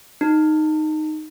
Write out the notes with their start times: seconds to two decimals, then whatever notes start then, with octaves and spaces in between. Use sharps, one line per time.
0.21 D#4